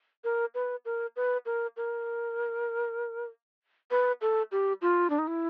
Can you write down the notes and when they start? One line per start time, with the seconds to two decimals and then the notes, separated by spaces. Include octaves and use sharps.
0.24 A#4
0.55 B4
0.85 A#4
1.16 B4
1.46 A#4
1.77 A#4
3.91 B4
4.21 A4
4.52 G4
4.82 F4
5.10 D4
5.19 D#4
5.27 E4